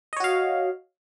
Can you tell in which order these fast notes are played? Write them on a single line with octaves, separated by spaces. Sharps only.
D#5 C#5 F#4 F5